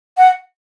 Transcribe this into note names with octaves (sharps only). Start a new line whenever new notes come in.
F#5